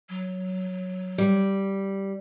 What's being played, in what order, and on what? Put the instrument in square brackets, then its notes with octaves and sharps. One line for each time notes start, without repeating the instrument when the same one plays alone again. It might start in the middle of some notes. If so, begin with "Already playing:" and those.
[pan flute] F#3
[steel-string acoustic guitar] G3